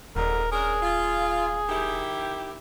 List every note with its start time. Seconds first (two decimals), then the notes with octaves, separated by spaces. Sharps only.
0.16 D#1 F2 G#2 D3 A#4
0.52 C#4 D4 G#4 A#4
0.83 F4
1.69 D#3 E4 G4